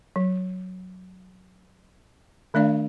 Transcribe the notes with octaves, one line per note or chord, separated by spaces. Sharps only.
F#3
D#3 A3 D4 D5 F5